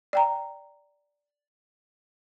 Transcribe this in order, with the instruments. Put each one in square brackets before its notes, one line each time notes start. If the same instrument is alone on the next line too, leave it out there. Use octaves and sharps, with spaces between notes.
[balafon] D5 G5 A#5